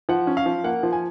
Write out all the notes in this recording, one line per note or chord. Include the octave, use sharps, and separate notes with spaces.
F3 F#5
C#4
F5
F3
A#3 F#5
F3
G#5